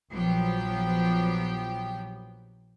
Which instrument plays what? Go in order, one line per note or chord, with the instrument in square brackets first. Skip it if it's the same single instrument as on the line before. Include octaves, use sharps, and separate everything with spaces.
[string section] A#1 F3 F#3 B3 G4 G5